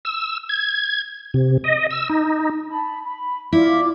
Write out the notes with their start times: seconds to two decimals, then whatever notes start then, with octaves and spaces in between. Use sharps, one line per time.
0.05 E6
0.49 G#6
1.34 C3
1.64 D#5
1.91 E6
2.09 D#4
2.70 A5 B5
3.03 B5
3.52 E4 F4 D5 D6